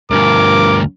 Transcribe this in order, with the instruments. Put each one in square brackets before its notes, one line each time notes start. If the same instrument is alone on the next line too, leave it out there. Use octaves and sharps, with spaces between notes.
[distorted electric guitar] D2 G2 [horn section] F3 A#4 [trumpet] D6